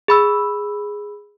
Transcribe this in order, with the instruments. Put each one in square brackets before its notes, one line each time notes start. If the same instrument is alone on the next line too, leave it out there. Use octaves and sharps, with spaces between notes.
[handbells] G#4 B5 E6